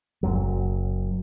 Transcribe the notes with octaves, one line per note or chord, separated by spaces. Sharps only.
F#1 F#2 F#3